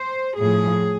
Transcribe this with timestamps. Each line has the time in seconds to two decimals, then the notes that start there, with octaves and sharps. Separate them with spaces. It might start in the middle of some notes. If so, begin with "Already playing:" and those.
Already playing: C5
0.37 A2 F3 G#4